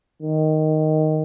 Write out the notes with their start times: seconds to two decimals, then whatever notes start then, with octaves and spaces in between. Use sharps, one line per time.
0.22 D#3